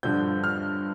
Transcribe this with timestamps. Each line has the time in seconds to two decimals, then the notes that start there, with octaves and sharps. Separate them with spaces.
0.03 G2 D3 F3 G6
0.44 F6